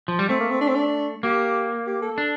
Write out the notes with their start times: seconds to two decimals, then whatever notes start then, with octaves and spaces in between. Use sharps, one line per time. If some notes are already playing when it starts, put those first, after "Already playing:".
0.08 F3
0.19 G3
0.29 A3 C4
0.40 A#3
0.50 C4
0.61 D4
0.68 C4
0.75 D4
1.23 A#3 G4
1.87 G4
2.02 A4
2.18 D4